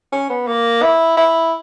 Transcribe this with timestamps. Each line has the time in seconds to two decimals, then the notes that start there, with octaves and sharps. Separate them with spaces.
0.12 C#4
0.30 B3
0.47 A#3
0.82 E4
1.17 E4